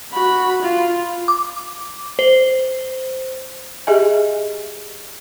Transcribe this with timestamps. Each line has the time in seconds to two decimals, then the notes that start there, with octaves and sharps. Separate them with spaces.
0.13 F#4 B5
0.61 F4
1.28 D6
2.19 C5
3.87 G4 G#4 D#5 E5 G#5